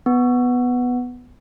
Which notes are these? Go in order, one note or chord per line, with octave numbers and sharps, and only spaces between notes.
B3